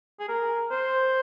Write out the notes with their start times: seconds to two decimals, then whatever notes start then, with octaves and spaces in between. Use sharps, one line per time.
0.20 G#4
0.29 A#4
0.71 C5